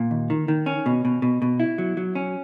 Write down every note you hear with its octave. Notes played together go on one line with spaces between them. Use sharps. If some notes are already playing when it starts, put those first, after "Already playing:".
Already playing: A#2
D#2
D#3
D#3
C#4
B2
B2
B2
B2
E4
F#3
F#3
C#4